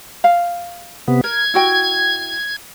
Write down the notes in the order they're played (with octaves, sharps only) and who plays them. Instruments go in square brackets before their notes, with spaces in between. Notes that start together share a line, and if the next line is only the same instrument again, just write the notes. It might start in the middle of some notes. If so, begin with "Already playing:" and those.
[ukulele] F5
[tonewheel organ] C3 B3
[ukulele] A#4 [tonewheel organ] G#6
[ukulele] E4 F#4 G5